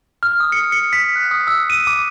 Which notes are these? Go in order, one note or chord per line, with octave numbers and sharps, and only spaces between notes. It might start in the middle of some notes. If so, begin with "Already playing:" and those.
F6
D#6
C#7
C#7
B6
F#6
D#6
E6
D#7
D6